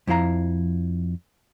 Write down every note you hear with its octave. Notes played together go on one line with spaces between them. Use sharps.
F2 F3 E4 F5 A#5